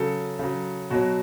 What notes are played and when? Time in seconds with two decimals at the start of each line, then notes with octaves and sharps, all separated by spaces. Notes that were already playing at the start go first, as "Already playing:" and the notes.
Already playing: C#3 F#3 A4
0.39 C#3 F#3
0.90 B2 F#3 F#4